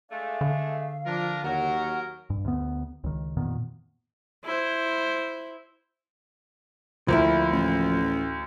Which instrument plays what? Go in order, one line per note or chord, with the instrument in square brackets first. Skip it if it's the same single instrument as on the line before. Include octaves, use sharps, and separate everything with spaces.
[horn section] G#3 A3 D4 [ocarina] F5
[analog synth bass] D3
[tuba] F3 [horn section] D4 F4 A#4
[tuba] D#2 [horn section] F#3 A#4 [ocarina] F#5
[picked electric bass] G2
D2 B3
C#2 D#3
F2 A#2 D#3 B3
[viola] E4 C5
[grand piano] D2 [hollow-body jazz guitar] F3 A#3 E4
[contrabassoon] A1